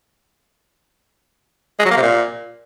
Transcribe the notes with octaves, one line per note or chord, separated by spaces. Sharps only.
G#3
F#3
A#3
C3
A#2